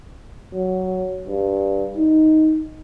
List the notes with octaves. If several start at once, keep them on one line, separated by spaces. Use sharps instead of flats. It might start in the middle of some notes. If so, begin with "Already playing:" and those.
F#3
G2
D#4